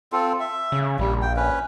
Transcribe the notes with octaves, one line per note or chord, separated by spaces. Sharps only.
C4 F4 A4
E5
C#3
A#1 G3
G5
C#4 B4